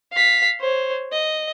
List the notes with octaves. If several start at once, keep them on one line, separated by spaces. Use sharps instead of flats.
F5 B6
C5 C#5
D#5